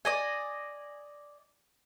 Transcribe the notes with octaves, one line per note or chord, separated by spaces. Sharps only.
D5 D#5 G#5